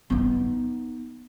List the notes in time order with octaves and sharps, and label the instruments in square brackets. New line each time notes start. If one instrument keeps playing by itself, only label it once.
[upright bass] B3 D#4